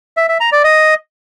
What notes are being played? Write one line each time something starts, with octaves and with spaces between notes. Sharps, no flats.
E5
E5
A#5
D5
D#5